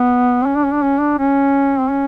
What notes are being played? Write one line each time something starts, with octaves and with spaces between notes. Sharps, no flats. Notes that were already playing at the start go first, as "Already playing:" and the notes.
Already playing: B3
C4
C#4
D4
C#4
D4
C#4
D4
C#4
C4
C#4